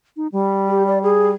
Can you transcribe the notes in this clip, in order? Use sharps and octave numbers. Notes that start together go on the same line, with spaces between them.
D#4
G3
G4
D5
G#4